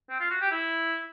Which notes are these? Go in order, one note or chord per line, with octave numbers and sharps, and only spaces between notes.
C4
F4
F#4
G4
E4